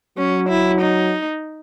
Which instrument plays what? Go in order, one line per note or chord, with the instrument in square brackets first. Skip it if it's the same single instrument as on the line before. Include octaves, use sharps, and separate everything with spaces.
[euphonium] F#3 [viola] C#4
[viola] E4
D#4